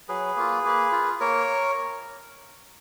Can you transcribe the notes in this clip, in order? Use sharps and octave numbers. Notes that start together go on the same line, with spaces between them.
F#3 G#4 B4
A#3 F4
A#3
F4
A#3 A#4 C#5